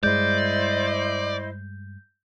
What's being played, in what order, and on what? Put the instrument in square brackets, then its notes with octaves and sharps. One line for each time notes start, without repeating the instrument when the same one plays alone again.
[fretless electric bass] G2 G#3 [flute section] E4 C5 D#5 [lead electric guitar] D5 [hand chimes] G6